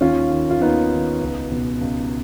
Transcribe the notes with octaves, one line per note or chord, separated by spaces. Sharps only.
D#2 C#4 F4
D#3
F4
D#2 B3 D#4
D#3
C#2
B2
C#2